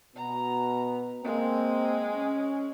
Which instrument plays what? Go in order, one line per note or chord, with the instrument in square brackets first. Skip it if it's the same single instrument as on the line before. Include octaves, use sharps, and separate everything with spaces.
[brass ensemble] B2 B3 [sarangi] A#5
[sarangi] G#3 [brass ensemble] A#3 C4
[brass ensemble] C#4